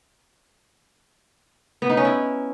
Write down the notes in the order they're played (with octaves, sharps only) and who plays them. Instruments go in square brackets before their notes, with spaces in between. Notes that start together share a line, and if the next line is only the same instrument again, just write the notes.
[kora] B3
D#4
C#4
E4